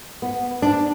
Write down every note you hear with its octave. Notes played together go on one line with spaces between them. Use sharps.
B3
D4